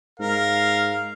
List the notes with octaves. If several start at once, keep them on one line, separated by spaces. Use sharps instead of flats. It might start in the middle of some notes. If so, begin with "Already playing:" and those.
G#2 A#4 F5